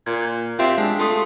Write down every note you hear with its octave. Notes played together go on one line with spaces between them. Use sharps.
A#2 G#6
C4 F4 G4 E5
G#3 D4
A3 F4 C6 D#6